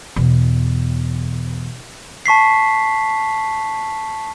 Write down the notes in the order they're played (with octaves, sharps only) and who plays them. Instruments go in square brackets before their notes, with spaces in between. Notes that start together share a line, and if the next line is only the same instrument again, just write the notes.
[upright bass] E2 B2
[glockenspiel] A5 C#6 B6 C7